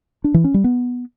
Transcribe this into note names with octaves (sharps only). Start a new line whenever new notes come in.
D4
E3
C#4
G3
B3